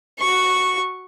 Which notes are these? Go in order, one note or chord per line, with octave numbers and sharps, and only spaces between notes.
F#4 C#6